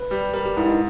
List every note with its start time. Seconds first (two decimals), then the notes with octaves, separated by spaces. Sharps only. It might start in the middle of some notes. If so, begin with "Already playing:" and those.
Already playing: B4
0.11 G3
0.33 G3 A#4
0.46 G4
0.57 G#2 E4
0.68 D#4